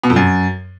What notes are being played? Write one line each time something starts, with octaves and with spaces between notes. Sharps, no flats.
B2
F2
F#2